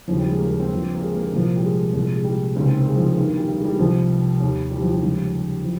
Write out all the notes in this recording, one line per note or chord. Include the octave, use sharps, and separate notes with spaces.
D#2 C#3 F3
G3
G#3
A#3
A#3
C4
G2 F3
A#3
G#3
A#3
C2 A#2 F3
G3
G#3
C2 A#2 F3
G#3
G3
C#2 C3 D#3 A#3
C4
A#3
G#3
F3
G#3
G2 D#3 A#3
G3
G3
G#3
G3
C2 C3 F3
D#2 D#3
G3
F3
G3
C#2 C#3 F3
F3